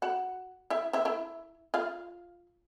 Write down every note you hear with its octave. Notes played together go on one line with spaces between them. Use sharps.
F#4 F#5
E4 E5
E4 E5
E4 E5
F4 F5